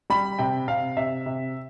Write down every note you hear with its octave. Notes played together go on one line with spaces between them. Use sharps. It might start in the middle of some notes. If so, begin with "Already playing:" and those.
G3 B5
C3 G5
C3 F5
C3 E5
C3